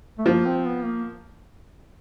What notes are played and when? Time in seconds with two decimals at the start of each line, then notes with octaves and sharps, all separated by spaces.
0.18 A3
0.26 F3 A#3
0.46 C4
0.65 B3
0.85 A#3